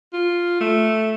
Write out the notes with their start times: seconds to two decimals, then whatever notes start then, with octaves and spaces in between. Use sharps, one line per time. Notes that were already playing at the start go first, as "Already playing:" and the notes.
0.13 F4
0.61 A3